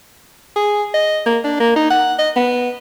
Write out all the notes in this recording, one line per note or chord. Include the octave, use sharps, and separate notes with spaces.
G#4
D#5
A#3
D4
A#3
D#4
F#5
D#5
B3